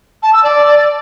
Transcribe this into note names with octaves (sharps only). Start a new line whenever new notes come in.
A5
E6
D5